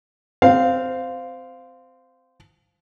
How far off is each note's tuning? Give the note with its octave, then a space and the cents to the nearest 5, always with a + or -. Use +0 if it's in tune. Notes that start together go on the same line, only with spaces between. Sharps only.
C4 -15 F5 +5